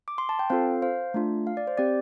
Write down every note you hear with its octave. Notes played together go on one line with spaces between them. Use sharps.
D6
C6
A5
G5
C4 F4 A4 C5 F5
C5 F5
A3 D4 F4
F5
D5
C5
C4 G4 D5